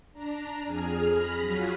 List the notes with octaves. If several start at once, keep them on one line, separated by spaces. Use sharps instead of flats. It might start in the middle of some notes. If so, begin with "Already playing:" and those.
D4 A#5
F2 G#4 F6
B5 F6 A#6 B6
F#3 F4 F#4 G#4